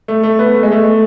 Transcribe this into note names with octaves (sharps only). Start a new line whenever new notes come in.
A3
A3
B3
A3
G#3
A3